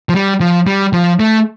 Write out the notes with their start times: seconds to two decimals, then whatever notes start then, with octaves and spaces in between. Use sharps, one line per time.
0.09 F3
0.14 G3
0.40 F3
0.67 G3
0.93 F3
1.20 A3